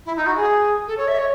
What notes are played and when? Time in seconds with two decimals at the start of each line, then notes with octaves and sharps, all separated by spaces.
0.05 E4
0.16 D#4
0.26 F#4
0.36 G#4
0.87 A4
0.97 C#5
1.07 E5
1.18 C#5